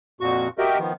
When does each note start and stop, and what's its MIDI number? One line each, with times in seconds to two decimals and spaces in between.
0.21 0.48 41
0.21 0.48 46
0.21 0.48 66
0.21 0.48 85
0.58 0.78 66
0.58 0.78 67
0.58 0.78 70
0.58 0.78 75
0.58 0.78 76
0.58 0.78 79
0.78 0.93 51
0.78 0.93 53
0.78 0.93 59